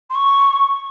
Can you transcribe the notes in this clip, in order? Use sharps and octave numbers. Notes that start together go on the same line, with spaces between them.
C6
C#6